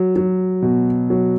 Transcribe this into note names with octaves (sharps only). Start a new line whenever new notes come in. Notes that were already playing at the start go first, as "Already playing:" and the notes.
Already playing: F#3
F#3
B2
F#3